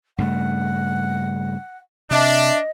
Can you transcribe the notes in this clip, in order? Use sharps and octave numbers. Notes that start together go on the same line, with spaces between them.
G2 C#3 A3 F#5
C3 D4 D#5 E5